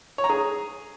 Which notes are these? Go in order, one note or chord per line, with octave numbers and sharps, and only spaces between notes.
C#5
A#5
G#4